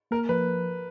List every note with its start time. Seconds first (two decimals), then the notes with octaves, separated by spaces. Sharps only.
0.11 A#3 A#4
0.29 F3 B4